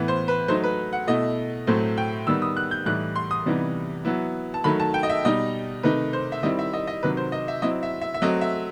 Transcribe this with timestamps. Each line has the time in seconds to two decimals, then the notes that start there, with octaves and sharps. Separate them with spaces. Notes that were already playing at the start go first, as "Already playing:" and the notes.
Already playing: A2 E3 B3
0.08 C5
0.28 B4
0.48 F#3 A3 D#4 C5
0.64 B4
0.93 F#5
1.07 B2 A3 E4 D#5
1.67 A2 F#3 A3 C4 C5
1.98 G5
2.27 D#3 G3 B3 E6
2.42 D#6
2.57 F#6
2.71 G6
2.86 A2 E3 G3 D#4 F#6
3.16 C6
3.31 D#6
3.46 C3 E3 G3 B3 D#4
4.05 F#3 B3 E4
4.54 A5
4.64 D#3 F#3 A3 B5
4.80 A5
4.94 G5
5.03 D#5
5.10 E5
5.25 B2 G3 D#4 D#5
5.83 C3 D#3 A3 D#4 B4
6.13 C5
6.32 E5
6.43 D#3 G3 C4 E4 D#5
6.59 E5
6.73 D#5
6.87 D#5
7.03 C3 D#3 F#3 B4
7.17 C5
7.32 D#5
7.48 E5
7.62 F#3 C4 E4 D#5
7.83 E5
8.01 E5
8.14 E5
8.22 F#3 A3 C4 D#5
8.41 E5